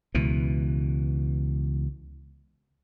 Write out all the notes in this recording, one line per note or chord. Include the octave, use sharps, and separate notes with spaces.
C#2 B2 E3